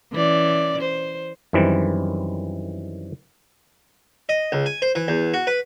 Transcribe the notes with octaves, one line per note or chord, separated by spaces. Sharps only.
E3 C#4 D5
C5
F#2 D#3 E3 G3 C4
D#5
C#2
G#5
C5
E3
E2
F#4
B4